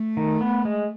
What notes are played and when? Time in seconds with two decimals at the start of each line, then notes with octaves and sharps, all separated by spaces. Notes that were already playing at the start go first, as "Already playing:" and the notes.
Already playing: A3
0.17 D#3
0.41 B3
0.65 G#3